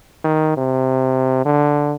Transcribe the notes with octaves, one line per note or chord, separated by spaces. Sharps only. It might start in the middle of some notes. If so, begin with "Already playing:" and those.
D#3
C3
D3